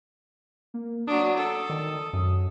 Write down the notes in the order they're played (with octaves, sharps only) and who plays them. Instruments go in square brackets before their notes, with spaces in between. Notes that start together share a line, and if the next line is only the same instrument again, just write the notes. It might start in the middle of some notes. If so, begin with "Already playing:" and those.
[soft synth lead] A#3
[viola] F#3 D4 [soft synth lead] D#6
[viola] A4
[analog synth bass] D#3
F#2